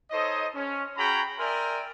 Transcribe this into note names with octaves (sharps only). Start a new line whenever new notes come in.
D#4 A4 C5 C#5 D#5
C#4
C#4 F#4 G#4 G5 A#5 B5
A#4 D5 E5 G5 G#5 C6